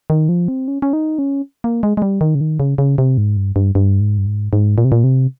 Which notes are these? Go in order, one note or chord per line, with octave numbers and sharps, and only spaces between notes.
D#3
F3
C4
C#4
C#4
D#4
C#4
A#3
G#3
G#3
G3
D#3
C#3
D#3
C#3
C#3
C3
G#2
G2
G2
G2
G#2
G2
G#2
G#2
A#2
C3
A#2
C3